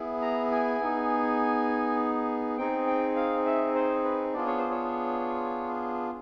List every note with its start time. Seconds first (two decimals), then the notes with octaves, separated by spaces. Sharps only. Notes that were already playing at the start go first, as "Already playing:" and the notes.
Already playing: B3 E4 G#4
0.22 A#5
0.51 G#5
0.80 B3 D#4 G#4
2.58 C4 D#4 G#4 G5
2.87 G5
3.16 F5
3.46 E5
3.75 C5
4.04 B4
4.33 B3 D4 F4 G#4 D5
4.47 C#5
4.58 C5
4.70 C#5